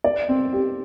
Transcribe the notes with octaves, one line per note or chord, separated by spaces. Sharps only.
D5
C4
G4